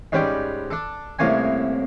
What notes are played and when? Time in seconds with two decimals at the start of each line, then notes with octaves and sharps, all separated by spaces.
0.12 G#2 G3 C#4 B4 D5 G5
0.71 D4 A4
1.19 C2 A2 A#3 C#4 G#5